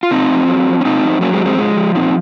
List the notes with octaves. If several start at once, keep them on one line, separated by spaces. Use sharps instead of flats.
F4
C3 C4 D#4
F2
F#3
F2
C#4
C3 C4 D#4
F2
C4
F#3 A#3 C#4
G#3 C4
F2
G#3 C4
F3 G#3
F3
A#2 C4 D#4